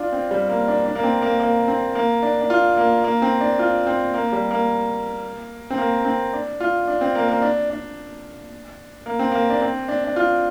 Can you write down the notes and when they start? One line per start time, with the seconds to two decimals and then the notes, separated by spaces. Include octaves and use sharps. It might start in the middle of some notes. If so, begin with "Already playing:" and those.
Already playing: D4 F4
0.13 C4
0.31 G3
0.49 A#3
0.68 D4
0.85 D4
0.95 A#3
1.03 C4
1.22 A#3
1.40 A#3
1.68 C4
1.95 A#3
2.23 D4
2.41 D4
2.50 F4
2.77 A#3
3.04 A#3
3.22 C4
3.41 D4
3.59 F4
3.87 C4
4.14 A#3
4.32 G3
4.51 A#3
5.70 C4
5.78 A#3
6.05 C4
6.33 D4
6.60 F4
6.87 D4
7.01 C4
7.15 A#3
7.29 A#3
7.42 D4
7.70 D4
9.06 A#3
9.19 C4
9.32 A#3
9.50 D4
9.62 C4
9.88 D4
10.04 D4
10.16 F4